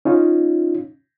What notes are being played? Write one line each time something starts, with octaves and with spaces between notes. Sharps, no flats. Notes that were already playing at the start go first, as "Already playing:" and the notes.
C#4 D#4 F4